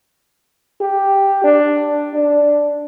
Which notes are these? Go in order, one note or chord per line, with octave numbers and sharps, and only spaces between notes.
G4
D4
D4